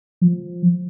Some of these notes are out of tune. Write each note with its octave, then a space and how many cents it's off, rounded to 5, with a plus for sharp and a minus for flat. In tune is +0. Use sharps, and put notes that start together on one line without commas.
F3 +10